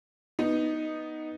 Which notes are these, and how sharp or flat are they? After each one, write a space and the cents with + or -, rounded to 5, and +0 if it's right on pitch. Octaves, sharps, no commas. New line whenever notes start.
B3 +0 D#4 +0